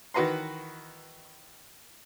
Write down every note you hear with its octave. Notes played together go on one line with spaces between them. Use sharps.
D#3 E3 F#4 B4 A#5 C6